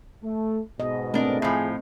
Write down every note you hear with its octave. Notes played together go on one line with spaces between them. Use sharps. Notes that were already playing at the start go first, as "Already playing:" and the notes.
A3
G#2 B2 D#5
A3 C4 D4 A#4 D#5
A2 F3 G#4